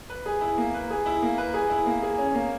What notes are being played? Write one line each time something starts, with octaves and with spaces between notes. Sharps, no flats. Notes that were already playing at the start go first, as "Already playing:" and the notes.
B4
G#4
E4
A#3
B4
G#4
E4
A#3
B4
G#4
E4
A#3
G#4
C#4
A#3